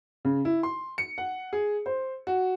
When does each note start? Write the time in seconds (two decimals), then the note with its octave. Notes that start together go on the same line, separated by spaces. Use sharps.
0.25 C#3
0.45 E4
0.63 C6
0.98 C#7
1.18 F#5
1.53 G#4
1.86 C5
2.27 F#4